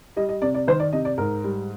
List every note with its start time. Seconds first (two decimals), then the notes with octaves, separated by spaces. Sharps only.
0.16 G3 D#5
0.29 D#5
0.42 C3 D5
0.55 D5
0.67 D#3 C5
0.80 D5
0.92 C3 D#5
1.05 D5
1.18 G#2 A#4
1.44 G3